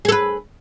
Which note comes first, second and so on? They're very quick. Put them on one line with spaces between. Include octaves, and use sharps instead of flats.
G#4 A4 B4